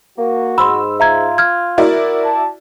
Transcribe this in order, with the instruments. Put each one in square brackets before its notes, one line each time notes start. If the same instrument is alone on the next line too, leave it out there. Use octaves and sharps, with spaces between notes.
[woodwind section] A#3 [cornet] F#4
[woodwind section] G#2 [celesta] B5 C6 [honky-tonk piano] E6
[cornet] F4 [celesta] E5 A#5 G#6
[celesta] F6 G#6
[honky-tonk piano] E4 F#4 D5 [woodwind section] A#4
[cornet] A5